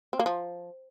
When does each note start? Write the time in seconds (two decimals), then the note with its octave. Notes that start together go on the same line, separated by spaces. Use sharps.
0.13 C4
0.19 A#3
0.26 F3